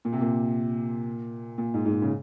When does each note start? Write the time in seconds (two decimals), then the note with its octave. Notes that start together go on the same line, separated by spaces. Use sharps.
0.05 A#2
0.12 C3
0.21 A#2
1.58 A#2
1.74 G#2
1.86 G#2
1.91 A#2
2.02 C#3